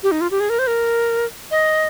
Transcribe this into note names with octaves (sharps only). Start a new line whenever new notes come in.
G4
D#4
F4
G4
G#4
A#4
C5
A#4
D#5